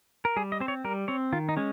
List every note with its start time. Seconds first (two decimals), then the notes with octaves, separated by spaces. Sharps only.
0.25 A#4
0.36 G3 G#4
0.52 D#5
0.60 C4 C5
0.68 C#5
0.84 G3 A#4
1.08 C4 C#5
1.32 D#3 F4
1.49 D#4
1.57 G#3 C#4